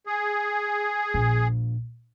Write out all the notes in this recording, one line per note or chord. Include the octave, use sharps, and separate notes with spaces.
G#4
A#1